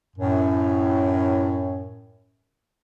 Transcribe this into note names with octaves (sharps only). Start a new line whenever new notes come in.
F#2 A2